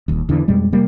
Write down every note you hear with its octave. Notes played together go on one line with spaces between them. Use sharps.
D#1 D#2
E2 D3 E3
F2 B2 G3 G#3
C3 G3 A#3